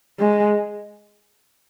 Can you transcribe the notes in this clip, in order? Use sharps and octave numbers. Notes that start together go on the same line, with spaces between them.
G#3